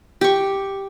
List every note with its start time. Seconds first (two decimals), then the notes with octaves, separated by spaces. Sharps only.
0.21 G4 C#6